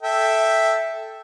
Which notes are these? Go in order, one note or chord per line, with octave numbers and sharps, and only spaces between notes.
A4 E5 G5